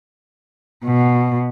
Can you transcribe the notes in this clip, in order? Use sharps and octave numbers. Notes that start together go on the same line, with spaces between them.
B2